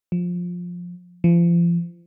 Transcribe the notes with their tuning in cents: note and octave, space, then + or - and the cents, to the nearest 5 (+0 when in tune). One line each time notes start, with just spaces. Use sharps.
F3 +15
F3 -35